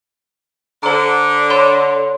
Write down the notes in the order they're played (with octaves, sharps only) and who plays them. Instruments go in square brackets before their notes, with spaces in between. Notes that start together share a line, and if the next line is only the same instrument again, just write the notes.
[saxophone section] D3 [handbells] C5 A#5
[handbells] C#5 B5 C6